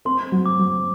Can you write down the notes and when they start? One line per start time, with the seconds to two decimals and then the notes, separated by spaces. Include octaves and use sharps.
0.05 C4 C6
0.32 F#3
0.46 D6
0.59 F#3